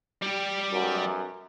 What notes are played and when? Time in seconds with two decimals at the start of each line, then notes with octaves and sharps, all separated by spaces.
0.22 G3 G4
0.72 B1 F#2